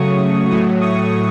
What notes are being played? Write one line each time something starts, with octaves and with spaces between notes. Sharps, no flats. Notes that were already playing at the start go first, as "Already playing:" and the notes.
Already playing: C#3 F#3 A3 C#6 D#6
A2 F#3 A3 C#6 D#6
C#6 D#6